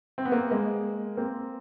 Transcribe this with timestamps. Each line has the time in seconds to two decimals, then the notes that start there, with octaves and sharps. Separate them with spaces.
0.18 C4
0.25 B3
0.32 A#3 C4
0.51 G#3 A#3
1.17 A#3 C4